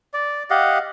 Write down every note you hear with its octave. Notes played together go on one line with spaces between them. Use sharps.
D5
G4 D#5 F5 F#5